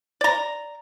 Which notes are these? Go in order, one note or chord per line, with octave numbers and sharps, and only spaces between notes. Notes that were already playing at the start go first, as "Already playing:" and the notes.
D5 A#5